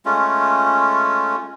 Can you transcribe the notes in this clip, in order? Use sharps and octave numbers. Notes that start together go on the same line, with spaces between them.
G#3 A3 C#4 F4